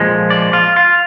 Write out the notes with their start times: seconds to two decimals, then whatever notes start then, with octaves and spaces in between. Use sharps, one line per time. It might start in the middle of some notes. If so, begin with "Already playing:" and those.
Already playing: A#2 F3 G#3
0.30 D5
0.53 F4
0.77 F4